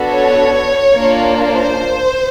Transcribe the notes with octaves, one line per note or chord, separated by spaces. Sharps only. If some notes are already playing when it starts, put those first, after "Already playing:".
Already playing: B3 D4 F#4 A4
C#5
A#3 D4 F4
C5